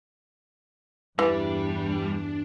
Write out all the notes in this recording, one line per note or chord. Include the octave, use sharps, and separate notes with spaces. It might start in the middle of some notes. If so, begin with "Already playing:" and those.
E2 G2 E3 G3 D4